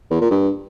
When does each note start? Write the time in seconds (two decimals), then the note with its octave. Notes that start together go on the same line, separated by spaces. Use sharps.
0.11 E2
0.21 A#2
0.31 G2